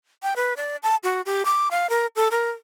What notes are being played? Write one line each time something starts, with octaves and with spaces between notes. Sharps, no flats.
G5
B4
D5
A5
F#4
G4
D6
F5
A#4
A4
A#4